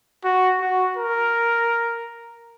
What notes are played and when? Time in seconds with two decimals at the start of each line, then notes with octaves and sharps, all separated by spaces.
0.25 F#4
0.60 F#4
0.97 A#4